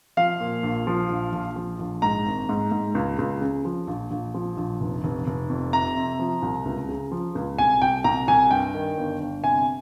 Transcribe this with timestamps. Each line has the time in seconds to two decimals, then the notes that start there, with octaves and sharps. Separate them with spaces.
0.17 F3 F5
0.40 A#2
0.63 A#1
0.87 F3
1.10 A#1
1.32 A#1
1.56 F3
1.79 A#1
2.02 G#2 A#5
2.26 G#1
2.49 G#2
2.72 G#2
2.95 C#2
3.19 C#2
3.41 C#3
3.65 F3
3.88 A#1
4.11 A#1
4.34 F3
4.57 A#1
4.80 F1
5.04 F1
5.27 F1
5.49 F2
5.73 C3 A#5
5.96 C3
6.19 F3
6.42 C2
6.65 C#2
6.89 C#3
7.12 F3
7.35 C#2
7.58 C2 G#5
7.82 C2 G5
8.04 C2 A#5
8.28 C2 G#5
8.51 G2 G5
8.74 D#3
8.97 G1
9.20 G1
9.44 C3 G#5